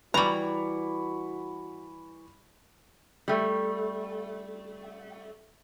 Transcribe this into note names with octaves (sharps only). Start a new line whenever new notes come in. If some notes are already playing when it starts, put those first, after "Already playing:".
E3 G3 F#4 A#5 B5 C#6 D6
G3 A3